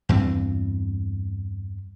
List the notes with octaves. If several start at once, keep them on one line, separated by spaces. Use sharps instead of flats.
E2 G2 E3 C4